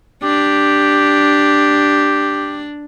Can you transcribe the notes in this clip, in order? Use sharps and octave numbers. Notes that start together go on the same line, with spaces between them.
D4 G4